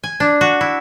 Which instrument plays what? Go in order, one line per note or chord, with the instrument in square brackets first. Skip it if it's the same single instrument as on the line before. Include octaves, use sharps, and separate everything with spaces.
[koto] G#5
D4
F#4
E4